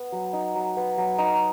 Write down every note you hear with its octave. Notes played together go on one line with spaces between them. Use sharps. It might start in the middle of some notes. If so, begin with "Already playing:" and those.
Already playing: B3
F#3
D#4
F#3
B3
F#3
D#4